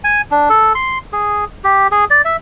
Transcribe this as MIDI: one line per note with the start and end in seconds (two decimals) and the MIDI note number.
0.04 0.21 80
0.31 0.49 62
0.49 0.73 69
0.75 0.98 84
1.13 1.45 68
1.64 1.87 67
1.92 2.05 68
2.10 2.22 74
2.25 2.36 76